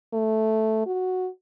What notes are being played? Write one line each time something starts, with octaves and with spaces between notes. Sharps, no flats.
A3
F#4